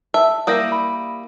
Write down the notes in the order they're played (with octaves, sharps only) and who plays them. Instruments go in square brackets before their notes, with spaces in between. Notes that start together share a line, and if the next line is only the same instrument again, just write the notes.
[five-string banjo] E5 [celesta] A5
[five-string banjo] G3 A#3 E4 [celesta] D#6 G6 A#6
[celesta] B5